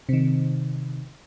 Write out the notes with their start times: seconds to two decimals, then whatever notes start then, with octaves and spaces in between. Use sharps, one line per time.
0.09 C3 D#3